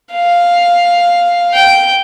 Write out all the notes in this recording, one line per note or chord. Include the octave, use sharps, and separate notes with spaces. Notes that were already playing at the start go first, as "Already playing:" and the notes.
F5
G5